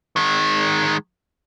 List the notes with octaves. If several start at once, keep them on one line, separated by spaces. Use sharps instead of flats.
D#3 G#3